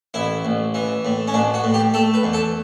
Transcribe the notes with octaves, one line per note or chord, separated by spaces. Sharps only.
A1 E4
A1
E3
A2
C#4
A1 D4
F#4
A2
G4
A3 A4
B4
E2
A4